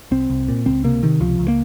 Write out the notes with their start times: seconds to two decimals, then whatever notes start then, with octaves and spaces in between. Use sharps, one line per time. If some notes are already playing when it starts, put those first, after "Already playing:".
0.11 C2 C4
0.30 C2
0.48 A#2
0.66 C#2 C4
0.84 C3 A#3
1.03 C3 D#3
1.20 C#2 F3
1.39 C#2
1.48 A#3